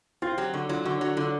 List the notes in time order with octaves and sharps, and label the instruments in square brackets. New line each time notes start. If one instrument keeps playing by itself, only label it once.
[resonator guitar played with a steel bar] C4 [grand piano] F4
[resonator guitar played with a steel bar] F#3 [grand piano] G4
[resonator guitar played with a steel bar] D3 [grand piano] F#4
[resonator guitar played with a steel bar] F#3 [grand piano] F4
[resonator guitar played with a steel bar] D3 [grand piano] F#4
[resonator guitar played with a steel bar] F#3 [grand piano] F#4
[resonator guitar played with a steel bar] D3 [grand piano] F4